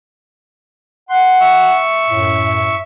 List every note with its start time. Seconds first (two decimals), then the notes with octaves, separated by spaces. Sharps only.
1.09 F#5 C6
1.40 E5 C#6
2.10 F#2 A2